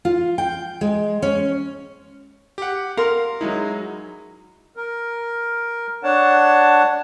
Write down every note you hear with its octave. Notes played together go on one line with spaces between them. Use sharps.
F4
G5
G#3
C#4
G4 F#5
A#4 F5 C6
F#3 G#3 D#4 E4
A#4
D4 C#5 F#5 A5